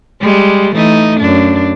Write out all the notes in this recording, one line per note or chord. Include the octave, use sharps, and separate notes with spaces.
G3 G#3
E3 A3 D#4
F#2 D4